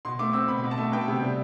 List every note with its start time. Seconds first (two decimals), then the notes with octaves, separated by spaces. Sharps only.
0.05 B2 C6
0.19 A3 D6
0.33 C4 E6
0.48 B2 B5
0.64 B2
0.71 A5
0.78 A3
0.92 B3 G5
1.08 C3
1.22 G3